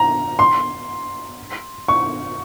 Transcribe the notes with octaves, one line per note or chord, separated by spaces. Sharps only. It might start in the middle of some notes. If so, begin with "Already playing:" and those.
Already playing: A#5
C6
C#6